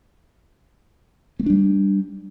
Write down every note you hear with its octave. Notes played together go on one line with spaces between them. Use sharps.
G3 A3 A#3 D4